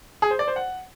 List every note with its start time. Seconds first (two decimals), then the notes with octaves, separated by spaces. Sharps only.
0.22 G#4
0.31 C5
0.39 D5
0.48 C5
0.56 F#5